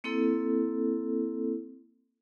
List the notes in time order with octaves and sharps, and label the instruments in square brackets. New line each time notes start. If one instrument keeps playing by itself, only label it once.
[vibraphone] A#3 C4 E4 A4